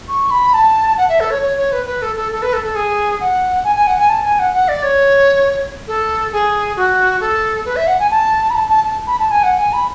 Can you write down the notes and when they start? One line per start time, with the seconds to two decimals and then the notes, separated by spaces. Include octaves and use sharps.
0.08 C#6
0.31 B5
0.54 A5
0.97 F#5
1.09 E5
1.20 A4
1.30 C#5
1.42 C#5
1.57 C#5
1.72 B4
1.86 B4
2.02 A4
2.16 A4
2.32 A4
2.42 B4
2.53 A4
2.64 A4
2.75 G#4
3.20 F#5
3.64 G#5
3.76 G#5
3.87 F#5
3.99 G#5
4.09 A5
4.24 G#5
4.39 F#5
4.53 F#5
4.68 D5
4.83 C#5
5.88 A4
6.33 G#4
6.76 F#4
7.20 A4
7.65 B4
7.76 E5
7.87 F#5
8.00 G#5
8.11 A5
8.50 B5
8.55 A5
8.69 A5
8.84 A5
9.07 B5
9.19 A5
9.31 G#5
9.43 F#5
9.58 G#5
9.73 B5